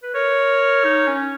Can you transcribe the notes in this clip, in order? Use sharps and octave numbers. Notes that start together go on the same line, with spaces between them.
B4
A#4 C#5
D#4
C#4